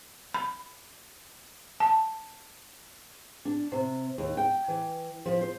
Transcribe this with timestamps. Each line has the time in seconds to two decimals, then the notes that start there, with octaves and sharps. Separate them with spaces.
0.35 B5
1.80 A5
3.45 D4
3.72 C3
4.18 D#2
4.37 G5
4.68 E3
5.26 F3
5.41 C5